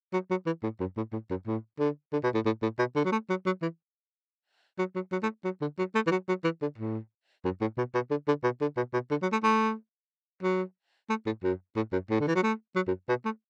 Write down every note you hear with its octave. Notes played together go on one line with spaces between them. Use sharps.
F#3
F#3
E3
A2
F#2
A2
A2
F#2
A2
D3
D3
B2
A2
A2
A2
B2
D3
F#3
A3
F#3
F#3
E3
F#3
F#3
F#3
A3
F#3
D3
F#3
A3
E3
F#3
F#3
E3
D3
A2
F#2
A2
B2
B2
D3
D3
B2
D3
B2
B2
D3
F#3
A3
A3
F#3
A3
A2
F#2
A2
F#2
A2
D3
E3
F#3
A3
F#3
F#2
B2
A3